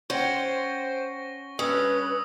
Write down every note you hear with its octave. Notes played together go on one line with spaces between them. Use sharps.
C#4 C5 F#5 G5 C#6 A#6 G7
G2 C#4 B4 D#6 E6